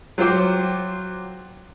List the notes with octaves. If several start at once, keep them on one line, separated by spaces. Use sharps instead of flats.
F#3 F4 C5 G5 D6